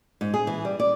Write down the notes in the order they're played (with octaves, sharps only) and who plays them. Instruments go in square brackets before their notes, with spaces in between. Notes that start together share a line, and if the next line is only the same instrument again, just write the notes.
[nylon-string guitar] G#2
G#4
E3
G3
D5